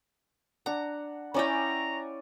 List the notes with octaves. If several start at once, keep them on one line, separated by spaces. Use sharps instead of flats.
D4 F#5 A#5
C#4 E4 C#5 D5 G5 G#5 A#5